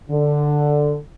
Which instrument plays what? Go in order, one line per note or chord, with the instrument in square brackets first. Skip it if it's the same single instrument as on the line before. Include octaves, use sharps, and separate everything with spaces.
[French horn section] D3